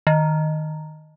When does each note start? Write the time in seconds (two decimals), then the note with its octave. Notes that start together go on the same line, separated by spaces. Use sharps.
0.07 D#3